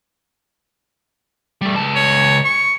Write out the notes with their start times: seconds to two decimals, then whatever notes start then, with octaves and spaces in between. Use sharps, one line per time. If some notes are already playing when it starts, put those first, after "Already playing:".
1.61 G3 A3
1.75 C#2 A5
1.95 C#5
2.45 C#6